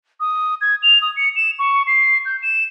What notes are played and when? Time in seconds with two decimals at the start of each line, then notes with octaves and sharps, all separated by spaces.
0.20 D#6
0.61 G#6
0.82 F7
1.02 D#6
1.16 C#7
1.36 E7
1.59 C#6
1.87 C7
2.25 G6
2.42 E7